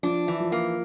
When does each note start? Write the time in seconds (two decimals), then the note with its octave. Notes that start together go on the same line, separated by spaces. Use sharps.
0.03 F3 D4
0.28 E3
0.40 F3
0.52 A#3